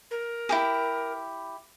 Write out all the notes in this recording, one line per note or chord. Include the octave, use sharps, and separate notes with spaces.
A#4
E4 G4 G#4